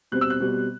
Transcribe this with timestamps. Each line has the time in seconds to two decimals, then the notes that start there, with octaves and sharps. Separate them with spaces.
0.12 B2 G3 C4 F#6
0.21 E6
0.30 F#6
0.40 B2 G3 C4